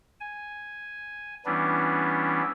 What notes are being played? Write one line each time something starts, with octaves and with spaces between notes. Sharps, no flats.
G#5
E3 G3 B3 C#4 D4 E4